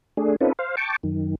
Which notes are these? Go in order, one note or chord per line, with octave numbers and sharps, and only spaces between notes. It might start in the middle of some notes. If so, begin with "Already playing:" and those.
A3 D4 G#4
C4 C#4 D#4 F4 A4 B4
C5 F5
G5 A5 C#6 D6
F#2 D#3